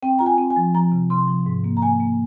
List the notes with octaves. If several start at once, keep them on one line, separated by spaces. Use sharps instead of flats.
C4 G5
F4 A#5
G#5
C4
G#5
F3
F3 A#5
C3
C3 C6
F3
G#2
A#3
A#5
A#3 G#5
A#3